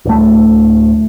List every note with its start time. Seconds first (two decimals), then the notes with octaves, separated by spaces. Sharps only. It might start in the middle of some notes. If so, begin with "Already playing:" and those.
0.05 D1 A3